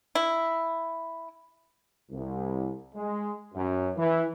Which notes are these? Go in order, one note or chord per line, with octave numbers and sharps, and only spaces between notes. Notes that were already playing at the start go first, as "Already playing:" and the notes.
E4
C2
G#3
F#2
E3